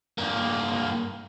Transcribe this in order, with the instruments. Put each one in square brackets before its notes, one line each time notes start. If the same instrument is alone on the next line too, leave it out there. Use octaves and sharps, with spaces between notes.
[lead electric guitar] G2 A#3